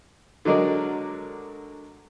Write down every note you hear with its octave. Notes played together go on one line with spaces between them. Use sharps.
D3 F#3 G#3 A#4 D5